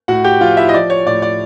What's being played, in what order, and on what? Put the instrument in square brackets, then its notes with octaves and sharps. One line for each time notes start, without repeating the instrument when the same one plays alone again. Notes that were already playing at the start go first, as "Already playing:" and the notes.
[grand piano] A2 F#4 F#5
G4 G5
F3 F4 F5
E4 E5
D#5
F3 D5
C#5
A2 D5
D5